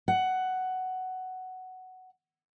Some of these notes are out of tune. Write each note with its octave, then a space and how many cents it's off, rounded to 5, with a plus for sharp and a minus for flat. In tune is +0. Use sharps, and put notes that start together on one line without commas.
F#5 +10